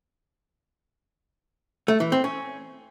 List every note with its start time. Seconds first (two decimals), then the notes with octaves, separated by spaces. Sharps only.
1.88 A3
2.00 E3
2.12 C4
2.24 C#4